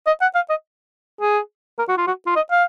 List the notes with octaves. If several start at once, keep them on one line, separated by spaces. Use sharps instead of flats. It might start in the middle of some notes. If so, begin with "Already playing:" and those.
D#5
F#5
F5
D#5
G#4
A#4
F#4
F4
F#4
F4
D#5
F5